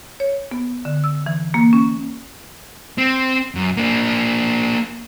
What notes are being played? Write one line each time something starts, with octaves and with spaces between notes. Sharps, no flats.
C#5
B3
D3
E6
E3
A#3
C#4
C4
F#2
A#3 D4